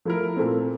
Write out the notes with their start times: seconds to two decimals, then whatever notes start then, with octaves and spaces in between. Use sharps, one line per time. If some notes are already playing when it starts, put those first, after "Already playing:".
0.05 F3 A3 E4 A#4
0.36 A#2 A3 C4